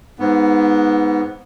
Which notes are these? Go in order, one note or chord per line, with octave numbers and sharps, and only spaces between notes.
G#2 B3